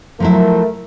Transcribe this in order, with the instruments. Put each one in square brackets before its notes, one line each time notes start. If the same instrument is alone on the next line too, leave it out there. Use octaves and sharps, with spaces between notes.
[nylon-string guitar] F3 F#3 E4 [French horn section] A3 A#4